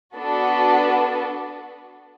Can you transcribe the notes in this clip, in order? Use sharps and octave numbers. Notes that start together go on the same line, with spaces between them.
B3 D4 F#4 A4